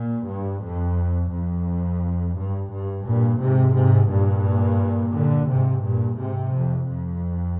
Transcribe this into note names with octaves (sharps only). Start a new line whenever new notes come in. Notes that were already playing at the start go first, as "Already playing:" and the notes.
Already playing: A#2
G2
F2
F2
G2
G2
G2 A#2
G#2 C3
G#2 C3
G2 A#2
A#2 D3
G#2 C3
G2 A#2
G#2 C3
F2
F2